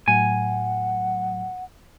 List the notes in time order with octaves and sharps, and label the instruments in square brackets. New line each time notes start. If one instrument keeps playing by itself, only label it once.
[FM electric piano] A2 F#3 [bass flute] F#5 [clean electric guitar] G#5